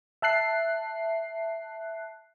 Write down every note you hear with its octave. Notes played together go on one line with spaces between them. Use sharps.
E5 A5 F#6 C7